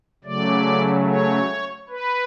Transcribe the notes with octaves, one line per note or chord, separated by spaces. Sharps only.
C#3 F#3 A3 D5
C#5
B4